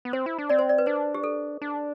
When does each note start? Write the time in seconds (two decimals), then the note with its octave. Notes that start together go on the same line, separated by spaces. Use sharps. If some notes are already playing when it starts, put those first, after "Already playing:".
0.05 B3
0.13 C4 C5
0.26 E4
0.38 D4
0.49 C4 D5
0.59 C5
0.69 D5
0.78 B4
0.86 D4 C5
1.14 G4
1.24 A4
1.61 D4